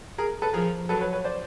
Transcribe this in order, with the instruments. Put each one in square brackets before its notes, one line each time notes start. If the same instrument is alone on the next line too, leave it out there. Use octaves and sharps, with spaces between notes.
[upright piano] G#4 A#4
A4 B4
[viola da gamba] F3 [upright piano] G#4 A#4
[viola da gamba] F#3 [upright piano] A4 B4
[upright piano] B4 C#5
B4 C#5
C5 D5